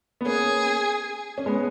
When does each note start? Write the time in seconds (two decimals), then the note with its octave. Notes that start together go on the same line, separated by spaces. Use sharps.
0.21 B3
0.25 A#3 C#4 G#4
1.38 C#4
1.46 G#3 B3